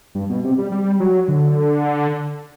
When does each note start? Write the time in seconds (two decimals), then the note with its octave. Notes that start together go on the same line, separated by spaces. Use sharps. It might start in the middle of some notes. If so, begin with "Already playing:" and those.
0.15 G2
0.30 B2
0.44 C3
0.58 G3
0.72 G3
1.00 F#3
1.28 D3